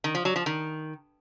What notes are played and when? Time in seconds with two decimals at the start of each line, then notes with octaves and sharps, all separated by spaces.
0.04 D#3
0.15 F3
0.25 F#3
0.36 F3
0.46 D#3